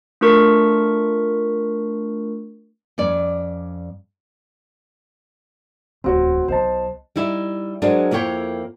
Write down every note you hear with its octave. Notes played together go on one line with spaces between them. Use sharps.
A3 D4 F4 A#4 C#6 B6
F2 C#4 D5
D1 E2 C4 F#4 C#5
B1 F#3 C5 D#5 A5
G3 D#4 E4 G4
F#3 G#3 C4 D4 G#4 A#4
F2 A#3 E4 C#5 G5